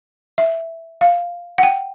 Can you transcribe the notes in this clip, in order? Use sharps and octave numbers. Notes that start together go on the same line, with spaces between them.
E5
F5
F#5
G5